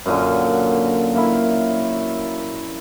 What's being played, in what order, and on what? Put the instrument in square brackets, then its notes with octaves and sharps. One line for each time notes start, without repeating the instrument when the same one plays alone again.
[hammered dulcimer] F#2 A#2 D3
A#3 E4